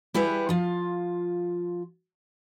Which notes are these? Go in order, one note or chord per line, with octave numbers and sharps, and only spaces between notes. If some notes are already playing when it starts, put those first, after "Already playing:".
G3 E4 G4 G#4 B4 F#5
F3 F4